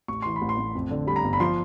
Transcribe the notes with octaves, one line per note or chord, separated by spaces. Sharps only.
A1 C#6
E3 C6
B5
A1
C6
A1
F2
D3
G3 B5
A#5
G1
B5
F3 C6